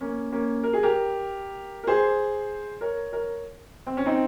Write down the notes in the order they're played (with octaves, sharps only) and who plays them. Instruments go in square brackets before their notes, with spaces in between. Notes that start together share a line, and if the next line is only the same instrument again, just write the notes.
[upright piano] A#3 C#4
A#3 C#4
A#4
G#4
G4 A#4
A#4
G#4 C5
A#4 C#5
A#4 C#5
C4
C#4
C4 D#4